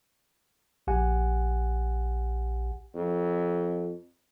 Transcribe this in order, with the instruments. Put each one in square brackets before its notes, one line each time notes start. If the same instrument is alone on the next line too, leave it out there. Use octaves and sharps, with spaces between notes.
[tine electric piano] A#1 G4 F#5 G#5
[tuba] F2